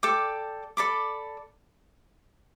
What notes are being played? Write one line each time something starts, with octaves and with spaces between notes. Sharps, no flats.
A4 D5 G5 D6
A4 D5 B5 D6